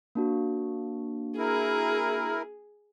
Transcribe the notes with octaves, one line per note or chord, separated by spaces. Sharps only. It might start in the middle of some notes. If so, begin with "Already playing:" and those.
A#3 D4 F#4
E4 G#4 A#4